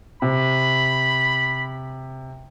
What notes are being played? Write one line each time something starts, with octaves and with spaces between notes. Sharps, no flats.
C3 B5